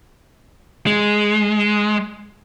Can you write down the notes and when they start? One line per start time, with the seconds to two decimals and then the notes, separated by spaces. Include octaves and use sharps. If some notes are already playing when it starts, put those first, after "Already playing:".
0.86 G#3